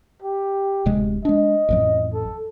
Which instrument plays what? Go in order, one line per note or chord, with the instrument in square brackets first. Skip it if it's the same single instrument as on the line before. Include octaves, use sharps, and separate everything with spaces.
[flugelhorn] G4
[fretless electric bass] D1 C3 G#3
[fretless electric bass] G#3 D4 [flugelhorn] D#5
[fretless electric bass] A1 F2 F#3
[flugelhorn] A4